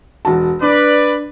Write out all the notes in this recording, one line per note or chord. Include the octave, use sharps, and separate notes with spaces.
E1 F#4 A5
D4 B4 D5